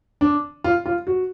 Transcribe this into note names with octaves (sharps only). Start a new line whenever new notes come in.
D4
F4
F4
F#4